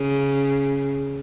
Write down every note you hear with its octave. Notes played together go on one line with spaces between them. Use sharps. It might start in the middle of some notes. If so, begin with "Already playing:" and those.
Already playing: C#3